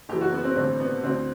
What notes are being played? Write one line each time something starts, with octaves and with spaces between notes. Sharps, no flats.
F#1 F#2 E3 G4
F#4
B3
C4
A1 G2 D3 C4
B3
D2 D3 C4